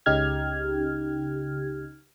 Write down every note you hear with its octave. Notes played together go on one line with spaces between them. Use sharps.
C#2 C#3 D#4 G4 F6 G#6